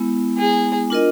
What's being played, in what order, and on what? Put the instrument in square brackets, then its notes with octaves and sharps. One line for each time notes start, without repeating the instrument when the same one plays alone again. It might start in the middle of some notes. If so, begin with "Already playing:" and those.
Already playing: [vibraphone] G#3 B3 E4
[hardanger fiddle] G#4
[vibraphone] D4 F4 A#4 D#5